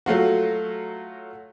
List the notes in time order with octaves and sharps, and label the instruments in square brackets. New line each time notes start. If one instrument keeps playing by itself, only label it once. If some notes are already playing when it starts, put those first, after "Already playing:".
[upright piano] F#3 A3 F4 F#4